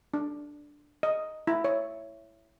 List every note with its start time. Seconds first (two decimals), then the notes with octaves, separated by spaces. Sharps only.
0.14 D4
1.03 D#5
1.47 E4
1.64 C#5